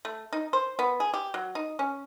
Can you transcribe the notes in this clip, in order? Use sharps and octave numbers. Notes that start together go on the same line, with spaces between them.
A3
D#4
C5
B3
G#4
G4
F#3
D#4
C#4